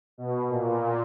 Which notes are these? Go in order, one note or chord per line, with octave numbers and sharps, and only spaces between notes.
B2
A#2